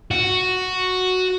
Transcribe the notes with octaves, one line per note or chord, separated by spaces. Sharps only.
F#4